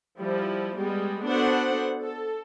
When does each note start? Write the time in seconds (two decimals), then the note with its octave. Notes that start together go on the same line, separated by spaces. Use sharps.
0.19 F3 G3 E4
0.77 G3 G#3 B3
1.25 B3 D4 F#4 A4 C5 F#5
2.02 A4